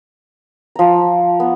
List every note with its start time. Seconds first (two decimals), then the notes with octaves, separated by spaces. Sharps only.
0.75 F3 A#5
1.40 B3